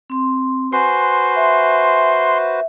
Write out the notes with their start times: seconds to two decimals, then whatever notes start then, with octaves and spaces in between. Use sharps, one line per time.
0.10 C4 C6
0.73 F#4 B4 C5 G#5 C6
1.36 E5